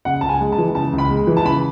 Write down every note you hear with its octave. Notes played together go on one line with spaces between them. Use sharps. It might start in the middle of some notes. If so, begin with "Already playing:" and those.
C#3 F#5
C#2 A5
G#5
G#3
A5
E3
C#3 A5
C#2
B5
G#3
E3
A5
C#3 B5